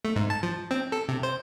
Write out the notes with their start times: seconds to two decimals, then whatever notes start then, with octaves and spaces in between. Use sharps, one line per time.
0.05 A3
0.16 G#2
0.30 A5
0.43 F3
0.71 C4
0.92 A4
1.08 C3
1.23 C5